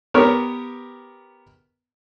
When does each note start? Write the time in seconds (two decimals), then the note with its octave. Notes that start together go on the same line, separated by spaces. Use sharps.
0.14 B3 G4 A#4 C#5 F6